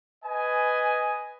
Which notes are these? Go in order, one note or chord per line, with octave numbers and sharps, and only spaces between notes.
B4 D#5 G#5